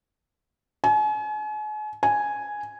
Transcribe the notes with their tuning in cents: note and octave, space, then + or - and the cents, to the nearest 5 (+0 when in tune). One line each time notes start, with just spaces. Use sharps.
G#5 +40
G#5 +0